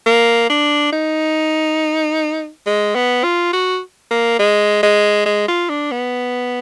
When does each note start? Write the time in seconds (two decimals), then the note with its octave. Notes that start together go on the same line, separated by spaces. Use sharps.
0.06 A#3
0.50 D4
0.93 D#4
2.66 G#3
2.95 B3
3.24 F4
3.53 F#4
4.11 A#3
4.39 G#3
4.83 G#3
5.26 G#3
5.48 F4
5.69 D4
5.92 B3